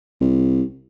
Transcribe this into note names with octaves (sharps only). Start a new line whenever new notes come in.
C2